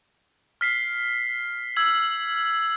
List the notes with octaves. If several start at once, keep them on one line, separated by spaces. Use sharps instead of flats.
F6 B6 C7
E6 G#6 F#7